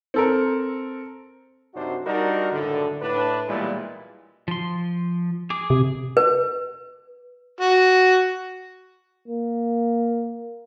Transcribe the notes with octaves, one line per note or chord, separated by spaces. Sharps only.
C4 A4 A#4
F#2 C3 D4 D#4 F#4 C5
G3 D4 D#4 F#4 A#4
C#2 F#2 A2 D3
A2 D4 B4
B1 A#2 E3 G3 G#3 E4
F3 C6
G#4 D6
C3
B4
F#4
A#3